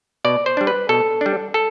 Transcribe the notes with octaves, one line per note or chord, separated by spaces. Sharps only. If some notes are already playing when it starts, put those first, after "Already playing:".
B2 D5
C5
G3 D4
B4
B2 A4
G3 D4
A4